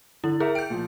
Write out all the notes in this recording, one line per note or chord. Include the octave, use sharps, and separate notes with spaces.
D3 E4
G#4 A#4 E5
G5 G6 D7
A#2 F3